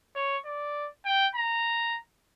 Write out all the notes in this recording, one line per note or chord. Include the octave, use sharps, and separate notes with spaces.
C#5
D5
G5
A#5